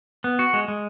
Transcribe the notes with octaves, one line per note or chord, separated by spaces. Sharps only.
B3
F#4
G#3
G#3